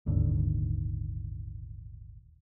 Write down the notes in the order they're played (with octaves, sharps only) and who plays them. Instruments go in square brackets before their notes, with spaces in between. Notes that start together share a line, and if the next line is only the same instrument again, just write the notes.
[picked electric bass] D#1 G#1 D#2 D3